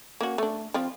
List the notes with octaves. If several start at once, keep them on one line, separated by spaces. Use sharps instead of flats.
A#3 C#4 F#4
A3 D4
F3 C4 F4